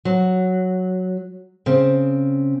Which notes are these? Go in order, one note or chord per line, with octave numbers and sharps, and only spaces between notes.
F#3
C#3 C4